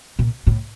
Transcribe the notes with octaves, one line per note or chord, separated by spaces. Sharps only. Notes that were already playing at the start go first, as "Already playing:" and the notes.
A#2
A2